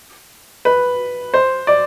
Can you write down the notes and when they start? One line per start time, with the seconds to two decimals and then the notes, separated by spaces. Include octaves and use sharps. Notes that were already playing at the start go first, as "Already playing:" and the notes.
0.65 B4
1.34 C5
1.67 D5